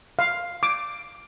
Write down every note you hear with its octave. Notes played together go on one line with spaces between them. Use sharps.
F5
D6